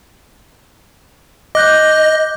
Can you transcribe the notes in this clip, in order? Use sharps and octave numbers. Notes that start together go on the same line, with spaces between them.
D#5 D6 F#6 G6